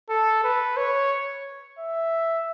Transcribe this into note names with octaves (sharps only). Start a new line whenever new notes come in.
A4
B4
C#5
E5